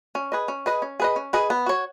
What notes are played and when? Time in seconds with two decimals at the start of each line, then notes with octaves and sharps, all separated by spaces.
0.15 C#4
0.32 G#4 B4 D#5
0.48 C#4
0.66 G#4 B4 D#5
0.82 C#4
1.00 G#4 B4 D#5
1.16 C#4
1.33 G#4 B4 D#5
1.50 B3
1.66 F#4 C#5